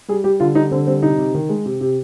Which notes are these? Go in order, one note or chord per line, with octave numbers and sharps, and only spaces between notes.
G3 G#4
G3 G4
D3 F4
G3 D#4
D3 C4
G3 C4
C3 D#4
C3
D#3
G#3
C3
C3